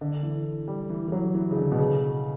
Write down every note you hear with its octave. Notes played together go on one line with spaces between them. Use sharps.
D3
E3
G3
E3
E3
F#3
E3
C#3
D3
B2
C#3